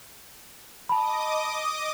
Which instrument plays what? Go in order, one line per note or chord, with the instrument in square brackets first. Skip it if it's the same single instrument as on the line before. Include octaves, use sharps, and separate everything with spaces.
[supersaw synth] D#5 D6 D#6 [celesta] A5 B5